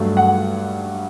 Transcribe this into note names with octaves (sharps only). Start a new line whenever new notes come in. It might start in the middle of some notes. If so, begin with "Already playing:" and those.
Already playing: G2 F#3 A3
F#5